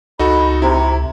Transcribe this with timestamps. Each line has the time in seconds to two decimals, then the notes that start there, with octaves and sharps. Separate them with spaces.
0.19 C#2 D#4 F#4 A4 B5
0.62 C3 E4 A#5